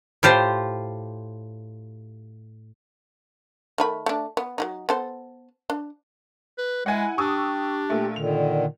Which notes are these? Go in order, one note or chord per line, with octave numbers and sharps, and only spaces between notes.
A2 F4 G4 C5
D#3 A3 B5
A3 D4
B3
F#3 A#3 D#4
B3 A4 C5
D4
B4
G#3 E4 F#5 G#5
D4 G4 C#6 D#6 E6
A#2 A3 A#3
A#2 D3 D#3 F7